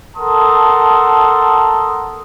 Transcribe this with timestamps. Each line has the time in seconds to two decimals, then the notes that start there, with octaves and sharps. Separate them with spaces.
0.17 A4 A#4 F#5 A5 C6 D#6